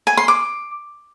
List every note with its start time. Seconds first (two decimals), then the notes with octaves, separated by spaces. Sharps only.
0.07 G#5
0.17 C6
0.28 D6